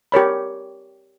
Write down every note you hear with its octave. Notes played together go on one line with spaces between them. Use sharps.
G4 A#4 C#5 B5